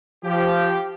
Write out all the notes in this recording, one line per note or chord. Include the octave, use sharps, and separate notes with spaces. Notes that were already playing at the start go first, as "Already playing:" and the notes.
F3 G4